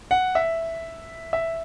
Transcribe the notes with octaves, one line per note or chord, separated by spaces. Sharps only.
F#5
E5
E5